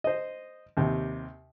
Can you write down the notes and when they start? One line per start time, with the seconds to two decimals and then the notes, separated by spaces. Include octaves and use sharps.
0.04 C5 D#5
0.77 D#2 C3